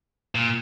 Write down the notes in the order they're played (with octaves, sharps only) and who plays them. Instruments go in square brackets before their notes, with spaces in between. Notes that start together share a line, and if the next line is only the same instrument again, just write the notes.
[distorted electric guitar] A#2